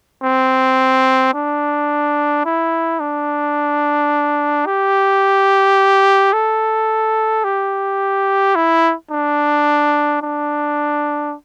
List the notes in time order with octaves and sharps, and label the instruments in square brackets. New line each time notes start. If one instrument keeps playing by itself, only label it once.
[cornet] C4
D4
E4
D4
G4
A4
G4
E4
D4
D4